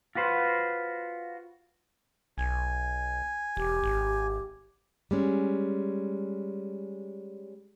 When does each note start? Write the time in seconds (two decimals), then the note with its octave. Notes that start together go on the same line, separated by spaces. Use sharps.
0.15 F4 F#4 B4 C5
2.38 B1 G#5
3.57 E1 G4
3.83 G#1
5.11 G3 G#3 C#4